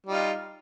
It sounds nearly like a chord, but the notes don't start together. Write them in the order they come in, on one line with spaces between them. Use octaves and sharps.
G3 D#4 F4